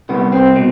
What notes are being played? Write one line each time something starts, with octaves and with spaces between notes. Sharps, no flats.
C2 B3
C4
B2